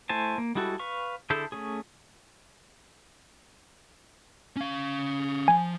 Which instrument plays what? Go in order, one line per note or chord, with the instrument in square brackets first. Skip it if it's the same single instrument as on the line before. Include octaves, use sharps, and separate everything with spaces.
[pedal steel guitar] A3 E4 C5 G#5 A5
A#3
G3 G#3 E4 F#4 A4
B4 F5 C#6
D3 E4 G#4 A4 G6
A3 C#4 G#4
[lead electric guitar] C#4 F5
[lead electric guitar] F3 [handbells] G#5